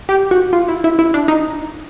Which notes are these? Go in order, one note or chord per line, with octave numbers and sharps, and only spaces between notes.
G4
F#4
F4
E4
E4
E4
D4
D#4